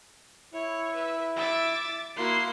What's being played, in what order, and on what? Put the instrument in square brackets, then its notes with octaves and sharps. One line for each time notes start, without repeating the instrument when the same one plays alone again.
[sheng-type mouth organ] E4 [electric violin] C#5
[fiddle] B4 [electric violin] E5
[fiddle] E5 [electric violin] D6 A6
[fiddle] A#3 E4 [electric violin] F#4 C6